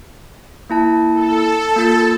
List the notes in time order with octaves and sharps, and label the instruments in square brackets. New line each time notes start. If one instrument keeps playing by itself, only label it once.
[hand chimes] A#3 E4 A5
[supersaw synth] A4
[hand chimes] A#3 F4 A6